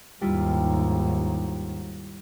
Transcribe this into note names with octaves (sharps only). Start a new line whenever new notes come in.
D#2 G#2 G3 E4 F4